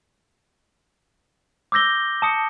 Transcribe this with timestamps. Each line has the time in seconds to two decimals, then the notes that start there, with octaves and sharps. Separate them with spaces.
1.72 D6 E6 G6 A#6 G7
2.22 A5 D#6 C#7